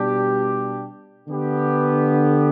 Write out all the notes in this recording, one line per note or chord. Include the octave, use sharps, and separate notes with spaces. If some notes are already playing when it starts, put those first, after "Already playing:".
Already playing: B2 G3 D4 G4
D3 B3 G4